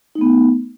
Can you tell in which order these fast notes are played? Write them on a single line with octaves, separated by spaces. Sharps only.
D#4 A3 B3